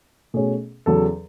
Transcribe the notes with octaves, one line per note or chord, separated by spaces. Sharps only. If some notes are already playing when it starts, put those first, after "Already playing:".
B2 A3 C#4 G#4
E2 C#3 F#3 A4